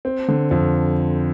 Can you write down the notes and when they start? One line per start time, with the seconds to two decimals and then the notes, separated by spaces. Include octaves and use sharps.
0.05 C4
0.28 D3
0.51 F2